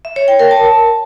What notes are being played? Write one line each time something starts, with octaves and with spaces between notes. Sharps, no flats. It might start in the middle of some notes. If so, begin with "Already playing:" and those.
E5
C#5
G5
A#4
A5